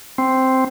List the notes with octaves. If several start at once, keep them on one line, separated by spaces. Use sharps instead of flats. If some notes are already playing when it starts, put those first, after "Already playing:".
C4